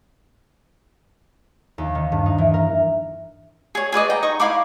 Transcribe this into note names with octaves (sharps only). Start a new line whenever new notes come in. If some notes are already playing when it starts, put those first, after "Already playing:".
D#2
D#3
G2
D#4
E3
A#4
G#4 C#5
G#4 B4 D5 D#5
G5 A#5
D#4 C#6 D#6
E4 F5 B5 D6